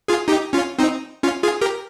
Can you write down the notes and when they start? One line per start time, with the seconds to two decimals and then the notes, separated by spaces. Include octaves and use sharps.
0.08 F4 G#4
0.28 D#4 G4
0.53 C#4 F4
0.79 C4 D#4
1.23 C#4 F4
1.43 F4 G#4
1.61 G4 A#4